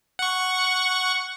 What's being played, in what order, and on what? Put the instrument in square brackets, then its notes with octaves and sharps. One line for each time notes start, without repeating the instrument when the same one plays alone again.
[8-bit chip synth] F#5 C#6